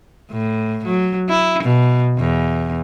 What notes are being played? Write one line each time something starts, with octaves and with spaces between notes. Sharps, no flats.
A2
F#3
E4
B2
E2